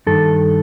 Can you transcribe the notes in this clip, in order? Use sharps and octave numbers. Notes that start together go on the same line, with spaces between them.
G2 D#3 A4